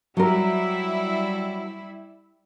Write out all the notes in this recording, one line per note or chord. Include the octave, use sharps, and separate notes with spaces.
F#3 G3 E4 A#4